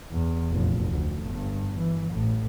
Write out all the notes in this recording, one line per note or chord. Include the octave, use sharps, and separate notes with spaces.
E2
F1 A#1
D2
G1 G2
E3
A1 A2